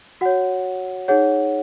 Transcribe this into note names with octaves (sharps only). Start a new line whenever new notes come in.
F#4 C#5 F#5
D#4 G#4 C#5 F#5